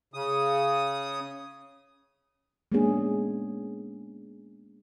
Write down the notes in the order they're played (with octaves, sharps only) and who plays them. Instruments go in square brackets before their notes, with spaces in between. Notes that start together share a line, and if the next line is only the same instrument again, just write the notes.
[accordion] C#3 D#6
[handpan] G#3 A#3 B3 C#4 D4 G#4